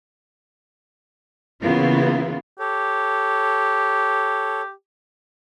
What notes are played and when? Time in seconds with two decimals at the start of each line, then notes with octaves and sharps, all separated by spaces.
1.60 C#3 E3 A#3 B3 E4 F4
2.59 G4 A4 C#5